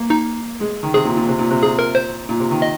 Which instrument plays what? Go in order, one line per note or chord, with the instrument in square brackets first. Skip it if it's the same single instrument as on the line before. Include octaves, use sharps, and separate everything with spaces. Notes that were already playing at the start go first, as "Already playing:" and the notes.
Already playing: [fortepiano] A#3
[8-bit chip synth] D#4
[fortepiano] G#3
D#3
[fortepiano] C3 [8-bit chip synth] G#4
[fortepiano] A#2
A#2
C3
A#2
C3
[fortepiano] A#2 [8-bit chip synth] G#4
[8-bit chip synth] A#4
C5
[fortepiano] A#2
C3
D#3
[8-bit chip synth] D#5